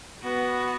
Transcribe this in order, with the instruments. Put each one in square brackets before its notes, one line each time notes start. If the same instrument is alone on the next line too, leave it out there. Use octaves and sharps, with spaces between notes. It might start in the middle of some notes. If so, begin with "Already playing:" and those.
[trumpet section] B3 [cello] F#4